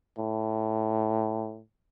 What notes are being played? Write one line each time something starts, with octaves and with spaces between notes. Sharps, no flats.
A2